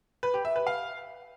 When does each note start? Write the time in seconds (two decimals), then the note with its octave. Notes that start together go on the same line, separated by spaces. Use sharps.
0.23 B4
0.34 G4
0.45 E5
0.56 B4
0.67 F5